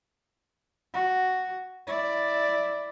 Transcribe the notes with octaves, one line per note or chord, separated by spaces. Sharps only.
F#4
E4 D5